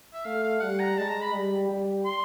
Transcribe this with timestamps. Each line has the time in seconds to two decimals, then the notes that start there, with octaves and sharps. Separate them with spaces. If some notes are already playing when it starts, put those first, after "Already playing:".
0.13 E5
0.25 A3 F5
0.43 F5
0.61 G3 F#5
0.80 A#5
0.97 G#3 A5
1.09 A#5
1.21 B5
1.33 G3
1.69 G3
2.05 C6